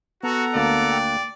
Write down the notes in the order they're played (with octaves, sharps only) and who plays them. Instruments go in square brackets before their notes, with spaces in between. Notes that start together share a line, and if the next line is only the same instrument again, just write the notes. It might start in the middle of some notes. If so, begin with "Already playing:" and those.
[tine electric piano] B3 [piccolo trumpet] F#4 [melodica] A4 F#5 A#5
[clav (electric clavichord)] D2 A#3 A5 [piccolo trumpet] D5
[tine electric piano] G5